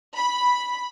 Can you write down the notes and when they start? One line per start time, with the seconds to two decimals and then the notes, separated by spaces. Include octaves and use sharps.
0.18 B5